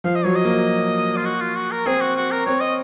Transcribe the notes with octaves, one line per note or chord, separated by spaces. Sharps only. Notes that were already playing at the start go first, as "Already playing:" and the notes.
F3 F5
D#5
F#3 C#5
D#5
A#3
F4
F#4
F4
F#4
A#4
C4 G#4
F#4
F#4
A#4
C4 C#5
D#5